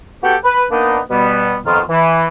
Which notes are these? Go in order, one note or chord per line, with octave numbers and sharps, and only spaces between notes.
B3 F#4 G4 A4 F#5 G5
B4
A#3 B3 D4 D#4
B2 G3 B3
F2 B2 D#3 F4
E3